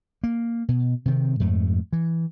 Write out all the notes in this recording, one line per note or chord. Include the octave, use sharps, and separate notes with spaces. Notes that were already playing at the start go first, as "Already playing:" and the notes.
A#3
B2
C3 D#3 C4
F2 G#2 A3
E3